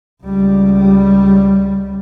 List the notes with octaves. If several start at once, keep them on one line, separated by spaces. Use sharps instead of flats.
C#2 G3